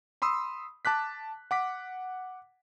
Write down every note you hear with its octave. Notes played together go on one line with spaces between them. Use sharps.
B5 C6 D#6 E6
A5 D6 F#6 B6
F#5 D6 B6